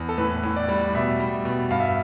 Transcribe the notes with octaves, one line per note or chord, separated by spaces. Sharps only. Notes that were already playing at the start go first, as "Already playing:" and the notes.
Already playing: E2
A4
A2 B4
A2
D5
G3
B2 E5
G3
B2
G2 F5
E5